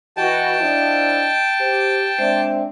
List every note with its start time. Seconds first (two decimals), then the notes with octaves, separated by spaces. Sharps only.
0.17 E3 F#4 D#5 G5 A5
0.59 F3 D4 E4
1.60 G4 C5
2.18 G#3 C4 D4 C5 E5